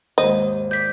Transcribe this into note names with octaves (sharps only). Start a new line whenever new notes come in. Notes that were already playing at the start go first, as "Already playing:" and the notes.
D#2 G#2 C5 D#5
D5 G6 B6